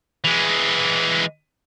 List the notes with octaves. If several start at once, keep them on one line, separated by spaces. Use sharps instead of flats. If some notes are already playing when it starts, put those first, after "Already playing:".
E3 G#3